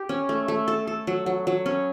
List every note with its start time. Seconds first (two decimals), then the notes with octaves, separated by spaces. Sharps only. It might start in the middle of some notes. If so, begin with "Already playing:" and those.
Already playing: G4
0.09 C#4
0.29 A3
0.48 A3
0.68 A4
0.87 A4
1.07 F#3
1.26 F#3
1.47 F#3
1.66 C#4